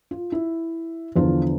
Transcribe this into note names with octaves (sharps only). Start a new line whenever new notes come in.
F4
E4
E2 D3 F3 F4